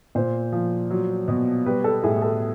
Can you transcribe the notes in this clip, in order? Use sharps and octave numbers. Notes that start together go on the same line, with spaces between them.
A#2 C5
F3
F#3
B2
G3 B4
A4
A2 G#4
A4